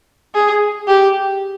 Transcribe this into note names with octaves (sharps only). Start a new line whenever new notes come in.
G#4
G4